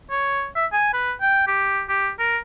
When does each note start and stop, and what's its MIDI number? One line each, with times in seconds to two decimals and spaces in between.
0.11 0.47 73
0.56 0.66 76
0.73 0.90 80
0.93 1.13 71
1.21 1.44 79
1.48 1.83 67
1.89 2.10 67
2.19 2.38 70